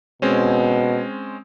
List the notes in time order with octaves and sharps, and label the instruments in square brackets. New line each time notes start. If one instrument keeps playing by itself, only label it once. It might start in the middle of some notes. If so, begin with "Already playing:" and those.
[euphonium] B2 [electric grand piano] G#3 C4 C#4